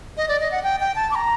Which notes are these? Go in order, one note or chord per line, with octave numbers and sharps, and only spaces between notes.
D#5
D5
D#5
F#5
G5
G5
A5
D6
A#5